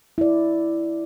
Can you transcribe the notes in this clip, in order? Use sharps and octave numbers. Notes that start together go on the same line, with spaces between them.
E4 D5